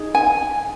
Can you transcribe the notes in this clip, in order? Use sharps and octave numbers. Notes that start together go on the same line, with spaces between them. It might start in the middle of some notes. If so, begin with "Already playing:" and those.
Already playing: D#4 G#4
G#5